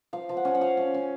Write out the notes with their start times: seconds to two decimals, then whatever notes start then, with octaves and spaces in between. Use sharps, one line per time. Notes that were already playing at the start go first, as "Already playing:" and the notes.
0.13 F3 F5
0.29 F3
0.37 F#5
0.45 C#4
0.55 F#5
0.61 F3 F5
0.77 C#4
0.94 C#4